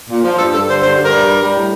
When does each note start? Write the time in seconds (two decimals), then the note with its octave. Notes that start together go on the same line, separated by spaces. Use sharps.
0.09 A#2
0.23 F3
0.37 G2 A4
0.53 G2 A4
0.67 D3 C5
0.81 G2 C5
0.96 G2
1.04 A#4
1.11 G3
1.25 G3
1.40 G3
1.55 A2